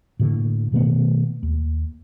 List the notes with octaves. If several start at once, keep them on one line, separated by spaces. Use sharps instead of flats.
A2 D3 A#3
B2 D#3 A3 B3
D#2